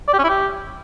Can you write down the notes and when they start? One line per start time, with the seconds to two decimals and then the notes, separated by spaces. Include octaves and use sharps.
0.08 D5
0.13 G4
0.19 C#4
0.24 E4
0.29 G4